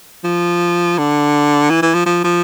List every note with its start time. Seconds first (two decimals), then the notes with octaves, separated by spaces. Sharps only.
0.24 F3
0.98 D3
1.70 E3
1.82 E3
1.94 F3
2.06 F3
2.24 F3